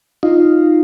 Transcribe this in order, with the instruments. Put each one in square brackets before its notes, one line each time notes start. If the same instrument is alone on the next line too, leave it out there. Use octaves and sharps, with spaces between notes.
[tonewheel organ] D#4 F4